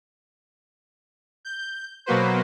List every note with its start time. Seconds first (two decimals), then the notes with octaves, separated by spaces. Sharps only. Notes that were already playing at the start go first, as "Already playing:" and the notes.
1.45 G6
2.06 B2 F#3 A#3 F#4 B4 C5